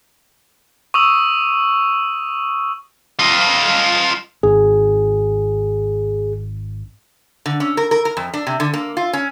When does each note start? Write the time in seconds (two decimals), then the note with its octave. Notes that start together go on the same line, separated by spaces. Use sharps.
0.94 C#6 D#6 E6
3.19 F4 D#5
4.43 G#1 G#4
7.46 D3
7.60 C#4
7.77 A#4
7.91 A#4
8.05 A#4
8.17 F2
8.34 D4
8.47 C3
8.60 D3
8.73 A#3
8.97 F4
9.13 C#4